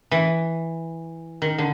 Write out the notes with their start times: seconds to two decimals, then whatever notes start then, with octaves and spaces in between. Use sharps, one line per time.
0.11 E3
1.42 D#3
1.58 D3